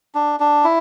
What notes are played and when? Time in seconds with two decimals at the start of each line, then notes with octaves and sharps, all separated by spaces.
0.15 D4
0.40 D4
0.64 E4